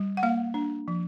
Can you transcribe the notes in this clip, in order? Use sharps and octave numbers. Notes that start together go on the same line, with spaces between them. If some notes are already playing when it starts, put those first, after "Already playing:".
Already playing: G3
F#5
A#3 F5
D4
F3